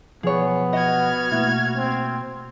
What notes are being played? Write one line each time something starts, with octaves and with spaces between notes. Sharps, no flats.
B1 F3 B3 G#4 C#5
F#4 D#5 F#5 F6 G#6
B2 A3 A#3 E4
C4